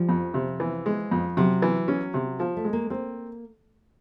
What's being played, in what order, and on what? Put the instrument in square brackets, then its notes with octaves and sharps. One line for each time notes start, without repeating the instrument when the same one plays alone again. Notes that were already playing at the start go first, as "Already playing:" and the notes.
Already playing: [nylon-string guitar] F3 [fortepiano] G3
[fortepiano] F2
C3
E3
G#3
F2
[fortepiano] C3 [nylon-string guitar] F#3
[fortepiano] E3
C#4
C3
F3
[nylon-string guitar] A3
[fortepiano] G#3
[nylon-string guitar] A#3
[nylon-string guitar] A#3 [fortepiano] C4